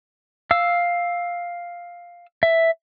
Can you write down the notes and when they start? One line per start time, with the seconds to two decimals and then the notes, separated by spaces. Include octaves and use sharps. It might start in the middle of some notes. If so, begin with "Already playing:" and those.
0.51 F5 E6
2.43 E5